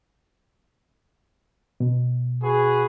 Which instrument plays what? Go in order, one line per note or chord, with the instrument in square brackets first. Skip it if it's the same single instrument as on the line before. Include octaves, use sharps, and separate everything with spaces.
[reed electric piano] B2
[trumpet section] F#4 G#4 B4